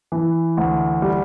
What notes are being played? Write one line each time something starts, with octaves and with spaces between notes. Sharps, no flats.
E3
D2
G3